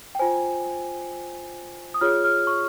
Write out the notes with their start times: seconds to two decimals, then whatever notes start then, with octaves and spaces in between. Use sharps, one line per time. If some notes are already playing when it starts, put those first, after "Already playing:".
0.15 G5
0.19 F4 C5 G#5
1.94 D#6
2.01 F4 G#4 C#5 F6
2.24 F6
2.47 C#6